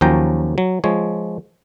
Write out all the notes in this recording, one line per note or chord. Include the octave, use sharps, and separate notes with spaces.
D#2 F3 F#3 C#4 G5 A#5
F#3
F3 G#3 C#5